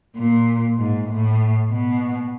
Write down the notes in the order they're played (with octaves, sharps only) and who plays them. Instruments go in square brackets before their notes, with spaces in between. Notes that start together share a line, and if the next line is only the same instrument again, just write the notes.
[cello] A#2
G#2
A2
B2